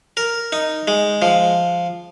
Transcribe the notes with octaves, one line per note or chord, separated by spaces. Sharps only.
A#4
D#4
G#3
F3